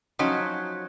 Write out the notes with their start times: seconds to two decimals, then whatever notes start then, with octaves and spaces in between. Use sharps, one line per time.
0.19 F3 F#3 C#4 D#4